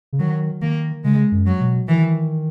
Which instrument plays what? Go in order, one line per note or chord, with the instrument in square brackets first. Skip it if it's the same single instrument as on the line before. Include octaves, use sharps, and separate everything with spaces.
[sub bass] C#3
[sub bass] D#3 [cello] F#3
[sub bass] D#3 [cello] A#3
[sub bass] C#3 [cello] G#3
[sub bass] F#2
[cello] F#3
[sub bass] B2
[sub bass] D#3 [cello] E3